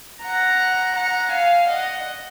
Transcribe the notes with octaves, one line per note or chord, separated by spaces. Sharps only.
F#5 A#5
F#5 A#5
F5 G#5
D#5 F#5